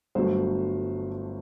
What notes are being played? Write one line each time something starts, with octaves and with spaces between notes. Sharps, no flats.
G1 G2 F#3 A3 C5